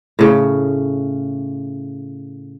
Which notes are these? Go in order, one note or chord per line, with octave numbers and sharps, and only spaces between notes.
A2 C#3